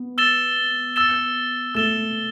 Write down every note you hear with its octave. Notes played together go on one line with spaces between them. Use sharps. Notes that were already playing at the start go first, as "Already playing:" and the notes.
Already playing: B3
E6 A6 E7 G7
E6 A6 E7 G7
A3 E6 A6 E7 G7